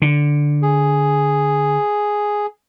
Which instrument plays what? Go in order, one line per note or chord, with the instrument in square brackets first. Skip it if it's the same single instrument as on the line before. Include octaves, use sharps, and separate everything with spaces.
[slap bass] D3
[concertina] G#4